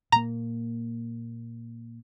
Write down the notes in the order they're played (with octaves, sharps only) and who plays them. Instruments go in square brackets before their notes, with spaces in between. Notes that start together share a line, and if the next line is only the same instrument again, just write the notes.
[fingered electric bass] A#2 A#3 [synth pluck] A#5